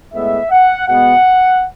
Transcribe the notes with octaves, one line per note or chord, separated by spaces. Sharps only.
A2 G#3 B3 E5
F#5
B2 G#3 B3 F#5